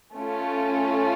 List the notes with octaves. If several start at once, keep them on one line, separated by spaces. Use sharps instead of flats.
A3 C#4 F4